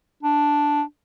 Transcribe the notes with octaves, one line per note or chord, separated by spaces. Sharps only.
D4